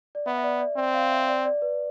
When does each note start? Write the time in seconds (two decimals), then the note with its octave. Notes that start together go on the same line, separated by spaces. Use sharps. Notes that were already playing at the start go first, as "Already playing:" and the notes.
0.15 D5
0.26 B3 E5
0.38 E5
0.43 D5
0.60 D5
0.76 C4 D5
0.94 F5
1.11 E5
1.28 D5
1.45 D5
1.62 B4